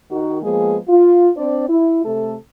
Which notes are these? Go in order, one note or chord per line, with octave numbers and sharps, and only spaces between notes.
D#3 F#4
F3 G#3 A#3 B3 G#4
F4
C4 D4 C5 D5
E4
C3 A3 A4